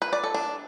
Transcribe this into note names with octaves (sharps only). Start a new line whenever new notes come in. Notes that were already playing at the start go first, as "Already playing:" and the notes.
B4
D5
A4
D4